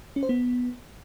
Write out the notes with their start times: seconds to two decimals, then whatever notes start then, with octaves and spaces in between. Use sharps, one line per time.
0.16 C#4
0.23 C5
0.29 B3